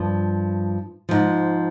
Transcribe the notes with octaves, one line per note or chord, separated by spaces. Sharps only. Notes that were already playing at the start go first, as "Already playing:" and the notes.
Already playing: G2 F3
G#2 F3